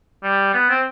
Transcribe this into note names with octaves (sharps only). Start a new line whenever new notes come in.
G3
B3
C4